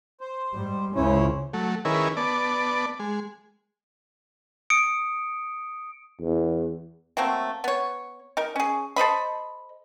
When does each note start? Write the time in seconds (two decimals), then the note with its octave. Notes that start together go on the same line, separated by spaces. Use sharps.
0.21 C5
0.54 G#2 G3
0.95 C#2 C#3 C#4 E4 C5 C#5
1.53 F#3 A3
1.85 D#3 C#4 E4 G#4 A#4 B4
2.17 B3 D5 A5
2.99 G#3
4.70 D#6 C#7 D7
6.20 E2
7.17 F#3 A3 A#3 C4
7.64 B3 C#5
8.37 D#4 A#4
8.56 C#4 G#4
8.96 A4 C5 D#5 B5